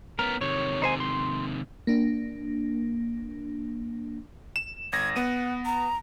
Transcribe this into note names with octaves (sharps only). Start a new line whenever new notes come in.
B3 C#4 A#4
C3 D#3 C#5
D#4 C5 G#5
C6
A#3 D4
E7
G1 G#6 A#6
B3 F#5 D#7
A#5